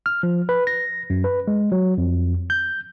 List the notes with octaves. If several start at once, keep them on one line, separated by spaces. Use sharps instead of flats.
F6
F3
B4
A#6
F#2
B4
G#3
F#3
F2
G6